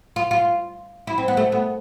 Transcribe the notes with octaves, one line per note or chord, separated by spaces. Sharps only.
F4
F4
E4
C4
B3
A3
B3